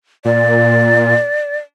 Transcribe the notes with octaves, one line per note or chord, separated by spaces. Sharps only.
A#2 D5